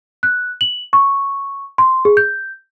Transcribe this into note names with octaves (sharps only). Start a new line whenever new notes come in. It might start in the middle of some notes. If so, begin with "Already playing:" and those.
F#6
F#7
C#6
C6
G#4
G6